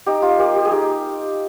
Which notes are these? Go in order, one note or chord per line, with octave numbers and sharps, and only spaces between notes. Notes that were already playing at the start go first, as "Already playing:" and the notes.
D#4 G4
F4
A#3 G4
G4
G#4
D#4 G4